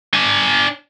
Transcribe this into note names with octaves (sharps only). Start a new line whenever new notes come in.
D4 G#5